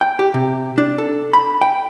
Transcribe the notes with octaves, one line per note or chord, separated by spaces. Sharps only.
G5
G4
C3
D4
A4
B5
G5